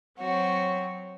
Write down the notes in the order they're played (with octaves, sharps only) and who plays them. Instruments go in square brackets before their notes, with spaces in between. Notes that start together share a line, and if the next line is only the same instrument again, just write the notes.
[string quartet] F#3 C4 F#4 C#5